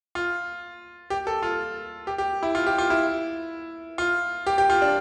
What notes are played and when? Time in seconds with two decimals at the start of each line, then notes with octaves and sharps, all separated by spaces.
0.15 F4
1.10 G4
1.27 A4
1.43 F4
2.07 G4
2.18 G4
2.43 E4
2.55 F4
2.67 G4
2.78 F4
2.90 E4
3.98 F4
4.47 G4
4.58 G4
4.70 F4
4.82 D4